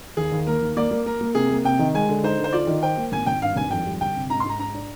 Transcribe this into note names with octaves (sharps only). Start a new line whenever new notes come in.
D#2 G#4
D#2
A#3 A#4
D#2
A#3 D5
A#3
A#3 A#4
A#3
C3 G#4
A#3
C3 G5
D#3
G#3 G#5
D3
D#4 C5
D3
C5
F4 D5
D#3
C5 G5
A#3
G#1 G#5
G#1 G5
G2 F5
G#1 G#5
F2 G5
G3
G1 G5
C3
G#2 A#5
C6
G#2 A#5
G#2 A#5
D4